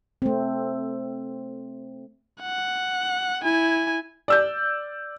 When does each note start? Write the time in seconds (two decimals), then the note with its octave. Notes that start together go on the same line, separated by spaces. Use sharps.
0.22 A3 C4
2.41 F#5
3.43 E4 G#5
4.28 D5 E6 G6